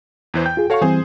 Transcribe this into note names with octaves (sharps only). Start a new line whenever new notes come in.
E2 E3 C5
G5 G6
F4 G#4
F#4 A4 C#5 F5 C#6
E3 G3 C4 G#4 C5 G#5